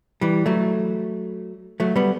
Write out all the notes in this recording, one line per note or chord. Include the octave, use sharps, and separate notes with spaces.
E3 G3
F#3 A3
F#3 A3
G3 B3